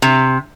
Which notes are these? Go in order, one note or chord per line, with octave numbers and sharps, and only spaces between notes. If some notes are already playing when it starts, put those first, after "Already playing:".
C3